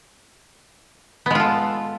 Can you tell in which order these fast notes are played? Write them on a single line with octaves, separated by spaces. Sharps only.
B3 G#3 F4 A4